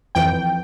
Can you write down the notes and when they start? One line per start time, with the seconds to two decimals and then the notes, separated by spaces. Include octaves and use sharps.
0.15 F2 E3 G5